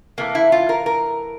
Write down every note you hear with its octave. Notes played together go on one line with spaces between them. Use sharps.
C3 E3 A3 A#3
E4
F4
A#4
A#4